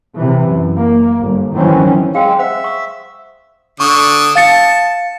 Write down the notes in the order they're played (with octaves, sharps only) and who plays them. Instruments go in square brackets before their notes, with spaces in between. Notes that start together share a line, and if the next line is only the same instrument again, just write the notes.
[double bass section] C3 E3
F#2
A#3
G1
D#3 E3 F#3 C4 C#4
[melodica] G#3 C4 [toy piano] G#4 F5 G5
[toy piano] C5 F#5 [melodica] E5
[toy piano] C#6 D#6
[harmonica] D3 D#6 [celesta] C#6
[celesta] F5 A6 C#7 [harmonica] A5